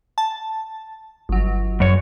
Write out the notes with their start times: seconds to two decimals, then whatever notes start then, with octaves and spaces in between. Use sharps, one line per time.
0.18 A5
1.29 G1 F#3
1.80 F#2 C#5